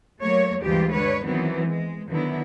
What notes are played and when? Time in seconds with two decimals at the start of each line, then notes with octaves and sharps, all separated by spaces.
0.22 F#3 A3 A#3 C#5
0.62 D2 G2 E3 G#3 F4 G4
0.92 G2 D3 B4 C#5
1.23 D#3 E3 F#3 B3 C4
1.67 G#3
2.08 D3 D#3 F#3 B3 E4